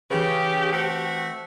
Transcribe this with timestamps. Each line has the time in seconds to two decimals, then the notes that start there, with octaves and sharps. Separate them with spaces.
0.11 C#3 E3 G4 B4
0.73 A3 C4 F#4